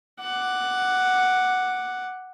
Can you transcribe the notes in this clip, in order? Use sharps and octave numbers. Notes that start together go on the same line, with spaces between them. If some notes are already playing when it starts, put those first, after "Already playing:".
F#5 D6